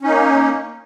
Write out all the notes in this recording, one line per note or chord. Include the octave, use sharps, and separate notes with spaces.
A#3 C#4 D#4